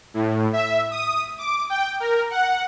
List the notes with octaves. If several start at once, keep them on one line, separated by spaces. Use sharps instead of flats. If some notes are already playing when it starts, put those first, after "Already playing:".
A2
E5
D#6
D6
G5
A#4
F#5